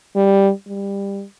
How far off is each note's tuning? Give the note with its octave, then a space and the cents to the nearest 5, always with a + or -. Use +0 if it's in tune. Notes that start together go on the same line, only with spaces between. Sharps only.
G3 +5
G3 +20